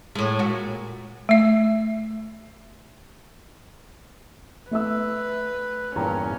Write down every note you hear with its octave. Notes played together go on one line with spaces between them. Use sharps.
A2 G#3
A#2 F#4
A3 E5
A3 B4 E5 E6
E2 G2 A#2 C#4 G5 A#5